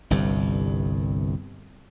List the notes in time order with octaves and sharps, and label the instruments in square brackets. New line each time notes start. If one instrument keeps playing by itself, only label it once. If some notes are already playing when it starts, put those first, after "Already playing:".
[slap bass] G1 C2 G2